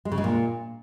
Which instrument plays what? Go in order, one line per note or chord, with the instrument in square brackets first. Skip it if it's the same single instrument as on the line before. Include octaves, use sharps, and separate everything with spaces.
[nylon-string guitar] G#3
C#3
G#3
A#2